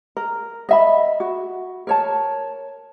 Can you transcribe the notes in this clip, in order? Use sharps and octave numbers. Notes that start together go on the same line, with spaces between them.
A#4
D#5 E5 B5
F#4
A#4 C#5 A5